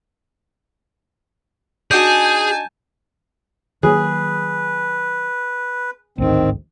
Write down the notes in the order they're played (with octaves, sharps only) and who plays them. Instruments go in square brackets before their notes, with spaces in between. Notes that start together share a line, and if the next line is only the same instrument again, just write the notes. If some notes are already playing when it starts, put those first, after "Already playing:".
[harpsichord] D4 D#4 F#4 [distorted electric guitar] G#4 [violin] G#5 A5 [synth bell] G6
[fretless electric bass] D#3 F#3 A#3 [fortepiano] G#4 [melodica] B4
[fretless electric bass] A1 D2 G#2 [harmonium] D#3 C4